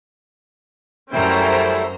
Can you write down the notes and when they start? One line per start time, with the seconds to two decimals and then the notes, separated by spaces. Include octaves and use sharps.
1.13 F#2 G3 A3 C#4 E4 C5 G5 A#5